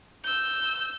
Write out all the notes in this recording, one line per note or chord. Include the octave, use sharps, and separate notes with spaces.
E6 G6